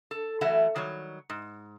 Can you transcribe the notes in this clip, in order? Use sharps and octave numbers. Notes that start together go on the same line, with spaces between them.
A4
E3 F#3 A3 E5 F#5
D#3 F#3 G3 C#5
G#2